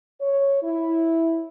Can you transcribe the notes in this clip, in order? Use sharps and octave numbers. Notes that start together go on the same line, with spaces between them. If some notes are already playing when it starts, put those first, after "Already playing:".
C#5
E4